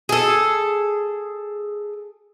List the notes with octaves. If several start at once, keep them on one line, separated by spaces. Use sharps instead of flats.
G#4 A4